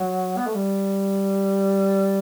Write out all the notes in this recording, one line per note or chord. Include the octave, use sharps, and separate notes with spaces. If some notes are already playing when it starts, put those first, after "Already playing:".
Already playing: F#3
B3
A3
G3